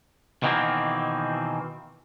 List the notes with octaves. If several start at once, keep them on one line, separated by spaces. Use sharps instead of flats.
B2 D#3 E3 A#3 C4